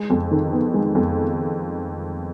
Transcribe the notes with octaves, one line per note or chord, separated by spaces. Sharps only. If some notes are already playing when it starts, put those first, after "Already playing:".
Already playing: G#3
F2
D#3
B3
G#3
F2